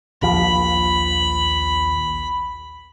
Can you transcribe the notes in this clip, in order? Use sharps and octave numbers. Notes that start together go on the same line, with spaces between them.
A#1 D#2 F3 B5